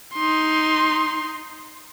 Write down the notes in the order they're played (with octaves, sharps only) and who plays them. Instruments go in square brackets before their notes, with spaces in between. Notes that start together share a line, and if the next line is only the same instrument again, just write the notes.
[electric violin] D#4 C6